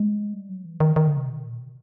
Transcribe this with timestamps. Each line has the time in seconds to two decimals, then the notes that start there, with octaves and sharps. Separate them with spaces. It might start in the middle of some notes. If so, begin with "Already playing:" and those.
Already playing: G#3
0.34 G3
0.49 F#3
0.65 E3
0.80 D#3
0.96 D#3
1.07 D3
1.17 C3
1.28 B2
1.43 A#2
1.59 B2